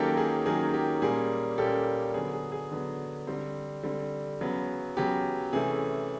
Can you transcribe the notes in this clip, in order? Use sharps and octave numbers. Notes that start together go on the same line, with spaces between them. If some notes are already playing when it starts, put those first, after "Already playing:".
Already playing: D#3 F#3 A#3 C#4 G4 A4
G#4
D#3 F#3 A#3 C#4 G#4
G4
A#2 G3 A#3 C#4 G#4
A#2 G3 A#3 C#4 G4 A4
D3 F#3 B3 G#4
G#4
G#4
D3 F#3 B3
D3 G3 C4
D3 G3 C4
C#3 F#3 B3
C#3 F#3 B3 G4
C3 E3 A3 C#4 G#4